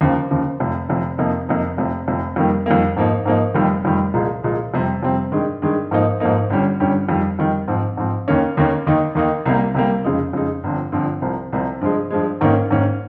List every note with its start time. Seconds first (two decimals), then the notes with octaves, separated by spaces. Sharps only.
0.01 D#2 C#3 F3
0.30 D#2 C#3 F3
0.60 F1 F2 C3
0.89 F1 F2 C3
1.18 F2 C3 F3 A#3 D#4
1.49 F2 C3 F3 A#3 D#4
1.77 F1 F2 C3
2.08 F1 F2 C3
2.36 F2 D#3 G3 A#3
2.66 F2 D#3 G3 A#3
2.96 G#2 F3 A#3 D#4
3.25 G#2 F3 A#3 D#4
3.54 F1 F2 D#3 G3
3.84 F1 F2 D#3 G3
4.14 C2 A#2 F3 G#3
4.43 C2 A#2 F3 G#3
4.74 F2 C3 G3 C4
5.03 F2 C3 G3 C4
5.32 G2 D#3 G#3
5.62 G2 D#3 G#3
5.91 G#2 F3 A#3 D#4
6.20 G#2 F3 A#3 D#4
6.50 G1 G2 G3 C#4
6.80 G1 G2 G3 C#4
7.09 F2 D#3 G3
7.39 F2 D#3 G3
7.68 G#2 F3 C4
7.97 G#2 F3 C4
8.28 D#2 D#3 A#3 C#4
8.57 D#2 D#3 A#3 C#4
8.87 D#2 D#3 A#3 D#4
9.15 D#2 D#3 A#3 D#4
9.45 C2 C3 G3 A#3
9.74 C2 C3 G3 A#3
10.04 F2 C#3 G#3 D#4
10.33 F2 C#3 G#3 D#4
10.64 G1 G2 F3 C4
10.92 G1 G2 F3 C4
11.22 C2 C3 F3
11.53 C2 C3 F3
11.81 G2 F3 G#3
12.11 G2 F3 G#3
12.41 G#2 D#3 A#3 C#4
12.71 G#2 D#3 A#3 C#4